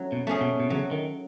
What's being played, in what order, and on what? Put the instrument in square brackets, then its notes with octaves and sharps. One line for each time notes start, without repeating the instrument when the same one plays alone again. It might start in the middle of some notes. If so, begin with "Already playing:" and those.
Already playing: [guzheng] F#3 A3 C#4
[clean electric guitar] B2
[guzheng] A3 C#4 G#4
[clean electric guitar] B2
B2
[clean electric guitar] C#3 [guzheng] F#3
[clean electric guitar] D#3